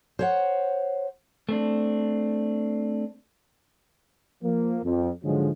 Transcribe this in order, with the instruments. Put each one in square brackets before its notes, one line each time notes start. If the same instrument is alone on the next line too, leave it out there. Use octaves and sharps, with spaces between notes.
[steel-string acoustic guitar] C5 C#5 F#5
[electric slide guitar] A3 C4 D4
[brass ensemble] F3 A#3
F2
G#2 D3 F3 F#3 G#3